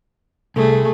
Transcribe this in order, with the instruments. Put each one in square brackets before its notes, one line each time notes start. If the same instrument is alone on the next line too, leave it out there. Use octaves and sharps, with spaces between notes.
[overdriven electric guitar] C2 [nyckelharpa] A3 G#4